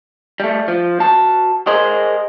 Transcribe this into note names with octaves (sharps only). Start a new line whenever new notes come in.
G3 A3
F3
F#4 A5
G#4 A#4 C5 D#5